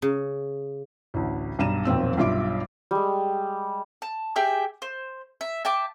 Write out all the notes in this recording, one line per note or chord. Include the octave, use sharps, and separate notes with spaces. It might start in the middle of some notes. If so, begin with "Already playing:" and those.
C#3
A1 D2
B1 G2 A#5 D#7 E7
D#1 B1 F2 C4 E6
B1 G2 F4 E5 D6 D7
G3 G#3
A5
G4 G#4 E5 G5
C5
E5
E5 G5 A5 D6